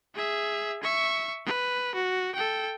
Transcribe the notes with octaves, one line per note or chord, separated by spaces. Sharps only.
G#4 E5
E5 C#6
B4
F#4
A4 G5